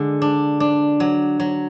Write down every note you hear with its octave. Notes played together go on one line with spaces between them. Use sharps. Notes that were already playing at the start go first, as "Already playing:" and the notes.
Already playing: D3 G#3
D4
D4
F#3
F#3